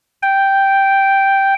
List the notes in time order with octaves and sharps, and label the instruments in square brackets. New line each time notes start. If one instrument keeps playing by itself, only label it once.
[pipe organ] G5